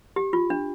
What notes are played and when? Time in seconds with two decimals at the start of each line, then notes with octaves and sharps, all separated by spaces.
0.16 G4
0.33 F4
0.50 D4